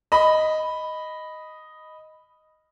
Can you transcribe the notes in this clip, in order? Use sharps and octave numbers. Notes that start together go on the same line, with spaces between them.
D#5 B5